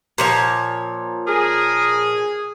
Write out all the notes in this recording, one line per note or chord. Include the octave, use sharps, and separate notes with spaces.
A#2 F3 C#5
G#4 A#4